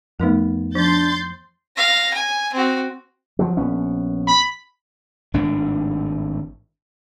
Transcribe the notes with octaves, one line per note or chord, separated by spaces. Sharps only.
F2 A3 B3 D#4 A#4
F3 D4 C6 G6 A6
F5 A#6
G#5
C4 F#4
F3 F#3
A#1 B3 C#4
B5
G#1 A2 D4